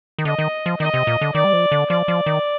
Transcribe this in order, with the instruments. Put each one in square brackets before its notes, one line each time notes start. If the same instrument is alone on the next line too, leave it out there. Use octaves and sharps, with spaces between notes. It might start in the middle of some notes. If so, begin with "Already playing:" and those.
[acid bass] D#3
[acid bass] D3 [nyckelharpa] D#5
[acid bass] D#3
F3
[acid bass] D#3 [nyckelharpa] D#5
[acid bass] C3
A#2
D3
[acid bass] D#3 [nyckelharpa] D5
[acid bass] G3
F3
D3
[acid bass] F3 [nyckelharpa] D5
[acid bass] F3
D#3